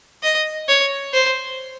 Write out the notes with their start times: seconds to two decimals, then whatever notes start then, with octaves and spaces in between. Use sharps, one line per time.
0.23 D#5
0.69 C#5
1.14 C5